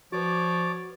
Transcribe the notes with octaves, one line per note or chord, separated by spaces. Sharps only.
F3 F#4 B4 C#5 D5 D6